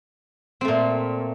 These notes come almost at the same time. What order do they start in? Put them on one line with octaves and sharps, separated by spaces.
C4 A3 A#2